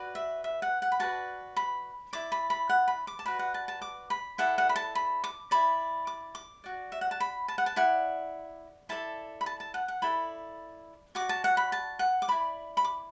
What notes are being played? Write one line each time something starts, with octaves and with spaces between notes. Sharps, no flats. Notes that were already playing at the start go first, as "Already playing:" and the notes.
Already playing: F#4 B4 D5
E5
E5
F#5
F#5
B5
F#4 B4 D5 A5
B5
E4 D5 D6
B5
B5
F#5
B5
D6
A5
F#4 B4 D5 B5
F#5
A5
A5
D6
B5
E4 A4 D5 F#5
F#5
B5
A5
B5
D6
E4 D5 B5
D6
D6
F#4 D5
E5
F#5
A5
B5
A5
F#5
A5
E4 D5 F#5
E4 A4 D5 A5
B5
A5
A5
F#5
F#5
E4 A4 D5 B5
F#4 D5 D6
A5
F#5
B5
A5
F#5
D6
E4 D5 B5
B5
D6